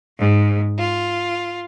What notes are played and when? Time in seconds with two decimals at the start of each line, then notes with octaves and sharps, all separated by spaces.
0.19 G#2
0.78 F4